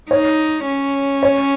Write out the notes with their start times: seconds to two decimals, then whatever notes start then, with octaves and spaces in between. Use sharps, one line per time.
0.11 D#4 C#5
0.67 C#4
1.23 C#5